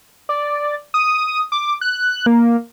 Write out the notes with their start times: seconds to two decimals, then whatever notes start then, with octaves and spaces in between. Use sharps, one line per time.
0.29 D5
0.94 D#6
1.52 D6
1.81 F#6
2.26 A#3